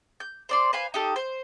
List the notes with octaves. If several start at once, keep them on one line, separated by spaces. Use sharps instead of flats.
G6
C5 D5 C6
B4 C5 F5 G#5
D#4 G4 A4
C5